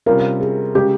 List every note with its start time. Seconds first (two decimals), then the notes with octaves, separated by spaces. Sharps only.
0.06 C3 G3 C#4 F4 A#4
0.40 G#4
0.75 C#3 G#3 C#4 G4